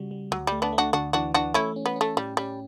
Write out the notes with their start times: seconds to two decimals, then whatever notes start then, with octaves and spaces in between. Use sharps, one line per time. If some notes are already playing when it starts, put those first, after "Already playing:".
Already playing: C#3 G3 F#4
0.11 G3
0.31 D2 F#3
0.47 G3 A3
0.62 B3 D4
0.72 A3
0.78 D4 F#4
0.93 D2 D4 F#4
1.13 E3 D4 F#4
1.34 E3 D4 F#4
1.54 A3 C#4 E4
1.76 C#4
1.86 B3
1.96 A3 C#4
2.17 A2 G3
2.37 G3 C#4